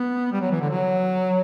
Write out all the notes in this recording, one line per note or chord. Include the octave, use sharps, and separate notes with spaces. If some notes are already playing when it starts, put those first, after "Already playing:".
Already playing: B3
G3
F#3
E3
D3
F#3